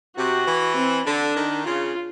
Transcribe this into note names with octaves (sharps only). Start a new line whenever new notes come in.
C3 F#4
E3
C4
D3 D4
D#3
C#3 F4